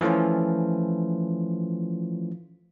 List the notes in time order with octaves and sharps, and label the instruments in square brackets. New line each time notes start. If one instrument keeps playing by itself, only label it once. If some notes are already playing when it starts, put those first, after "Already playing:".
[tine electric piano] E3 F3 A3 C#4 F4